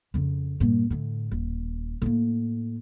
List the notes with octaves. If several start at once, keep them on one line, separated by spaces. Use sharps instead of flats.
F2 C#3
G2 A#2
A2 D3
D#1
A2 A#3